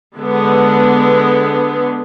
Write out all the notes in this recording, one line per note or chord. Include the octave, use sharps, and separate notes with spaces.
D3 G#3 B3